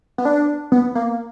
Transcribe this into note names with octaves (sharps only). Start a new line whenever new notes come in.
B3
D4
B3
A#3